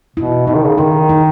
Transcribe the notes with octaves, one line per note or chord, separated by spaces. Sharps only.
B2 E4
B2 D#4
D#3
C#3
D#3 D#4
D#4